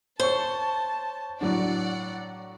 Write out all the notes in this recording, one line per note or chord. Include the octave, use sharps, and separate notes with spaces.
C5 C#5 A5 C#6
A2 F#3 D4 D5 F#5